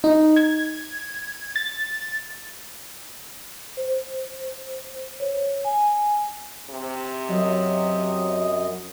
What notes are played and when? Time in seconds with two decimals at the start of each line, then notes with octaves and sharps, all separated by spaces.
0.04 D#4
0.36 G#6
1.56 A6
3.77 C5
5.20 C#5
5.65 G#5
6.70 C3
7.29 F#2 F#3 D#5